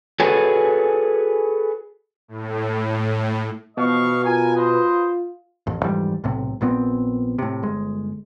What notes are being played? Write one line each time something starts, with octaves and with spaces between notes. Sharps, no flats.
F#4 G#4 A4 B4 C#5 G#5
A2
B2 E3 F3 B3 D#5 F5 C#6
F4 A#4 G#5
B4 C5 D#5
A1 F2
F2 G#2 E3 G3
B1 A2 C3
A#1 A#2 B3 C4
A2 C3
G1 G#3